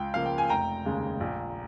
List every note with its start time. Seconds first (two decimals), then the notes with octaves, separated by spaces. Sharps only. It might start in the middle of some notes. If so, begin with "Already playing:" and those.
Already playing: C#2 G5
0.14 C#3 F3 A#3 F5
0.26 G5
0.38 G#5
0.49 F1 G5 A#5
0.85 D#2 C#3 G#3
1.20 A#1